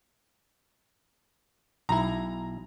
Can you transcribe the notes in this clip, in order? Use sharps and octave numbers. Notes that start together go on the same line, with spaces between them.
B1 E4 A#5